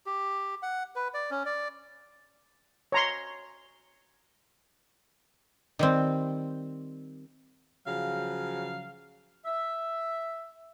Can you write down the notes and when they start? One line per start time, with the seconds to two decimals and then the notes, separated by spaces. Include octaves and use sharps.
0.06 G4
0.63 F#5
0.96 B4
1.14 D5
1.31 C#4
1.46 D5
2.92 C#5 A#5 C6
5.79 D#3 G3 C4
7.86 C#3 F3 F#3 F5
9.45 E5